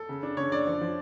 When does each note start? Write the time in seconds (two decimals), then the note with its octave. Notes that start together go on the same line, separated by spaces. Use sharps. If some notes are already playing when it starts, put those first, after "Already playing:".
Already playing: A4
0.09 C#3
0.23 D4
0.37 C#3 C#5
0.52 D4 D5
0.67 F3
0.81 F3